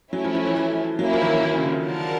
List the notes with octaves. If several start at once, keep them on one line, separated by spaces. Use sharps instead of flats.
F#3 A3 C#4 E4
F3
F3
E3
E3
F#3 A#3 C#4 E4
F3
D#3
E3
D#3
C#3
D3
F4 A#4 D5 F#5 A5